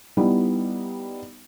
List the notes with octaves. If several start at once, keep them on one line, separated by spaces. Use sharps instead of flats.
G3 B3 D#4 E4